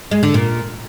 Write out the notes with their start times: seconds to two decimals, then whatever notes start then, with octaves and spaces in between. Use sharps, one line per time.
0.11 G#3
0.23 D3
0.34 A#2